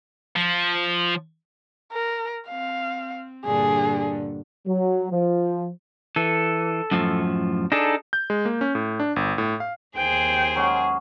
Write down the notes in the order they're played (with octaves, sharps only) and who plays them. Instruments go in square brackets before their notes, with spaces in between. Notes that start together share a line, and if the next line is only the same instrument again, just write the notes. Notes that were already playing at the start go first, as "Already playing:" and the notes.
[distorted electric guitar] F3
[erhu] A#4
[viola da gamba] C4 [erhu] F5
[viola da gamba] G2 A#2 D3 [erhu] G#4
[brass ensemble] F#3
F3
[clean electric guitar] E3 [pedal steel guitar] A4
[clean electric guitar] F#2 A2 F3
[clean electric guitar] D4 [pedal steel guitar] D#4 G#4 A4
[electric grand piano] G6
G#3
A#3
C#4
A2
D4
G1
A2
F5
[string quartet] D#2 G#4 C5 [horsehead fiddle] G5
[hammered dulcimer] F#3 G#3 C#4